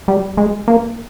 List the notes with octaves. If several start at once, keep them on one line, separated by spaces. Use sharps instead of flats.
G3
G#3
A#3